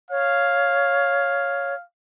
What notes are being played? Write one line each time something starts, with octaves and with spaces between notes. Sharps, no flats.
C#5 F5